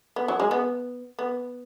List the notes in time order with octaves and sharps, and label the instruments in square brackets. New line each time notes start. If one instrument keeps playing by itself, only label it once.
[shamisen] B3
F#3
G#3
B3
B3